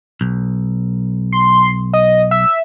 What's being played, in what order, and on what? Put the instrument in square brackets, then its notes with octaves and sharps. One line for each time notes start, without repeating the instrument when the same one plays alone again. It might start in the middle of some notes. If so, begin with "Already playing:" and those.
[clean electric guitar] B1
[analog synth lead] C6
D#5
E5